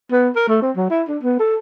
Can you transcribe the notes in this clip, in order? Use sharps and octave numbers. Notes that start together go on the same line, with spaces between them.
B3
A#4
A3
C4
F#3
E4
D4
B3
A4